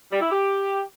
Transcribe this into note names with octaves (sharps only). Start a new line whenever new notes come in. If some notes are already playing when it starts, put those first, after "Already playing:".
G3
E4
G4